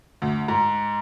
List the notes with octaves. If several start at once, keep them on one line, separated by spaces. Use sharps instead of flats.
D2
G#2